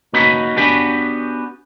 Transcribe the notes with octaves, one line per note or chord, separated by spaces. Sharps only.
A#3 C#4 D#4 F#4 B4
B3 C#4 D4 F#4 G4 B4